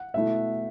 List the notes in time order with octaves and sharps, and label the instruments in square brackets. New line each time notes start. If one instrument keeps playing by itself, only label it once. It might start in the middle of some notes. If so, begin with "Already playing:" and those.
Already playing: [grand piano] F#5
[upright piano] B2 A3 E4 [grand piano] E5